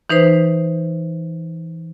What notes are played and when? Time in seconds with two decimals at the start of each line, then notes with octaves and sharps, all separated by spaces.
0.10 E3 D#4 B4 C5